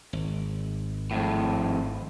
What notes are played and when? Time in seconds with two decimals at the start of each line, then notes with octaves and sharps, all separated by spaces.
0.13 G#1
1.11 F2 A2